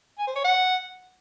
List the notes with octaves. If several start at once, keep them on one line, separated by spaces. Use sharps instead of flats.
G#5
C5
C#5
F#5